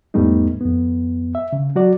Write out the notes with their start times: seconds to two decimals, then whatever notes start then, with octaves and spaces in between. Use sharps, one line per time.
0.14 E2 G#2 G3 A3 B3 D#4
0.61 F2 B3
1.35 E5
1.53 C#3
1.76 F#3 F#4 D5